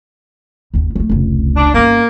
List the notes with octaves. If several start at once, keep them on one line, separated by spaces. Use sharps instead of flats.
F#1 D#2
F3 A3
F1 C#2
D4
G1 A#3 C#4